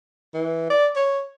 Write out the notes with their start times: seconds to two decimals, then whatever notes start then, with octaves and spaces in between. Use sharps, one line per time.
0.34 E3
0.70 D5
0.96 C#5